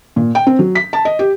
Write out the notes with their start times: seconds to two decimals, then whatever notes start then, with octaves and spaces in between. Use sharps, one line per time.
0.16 A#2
0.35 G5
0.47 C4
0.59 F#3
0.75 B6
0.93 A5
1.05 D#5
1.19 G4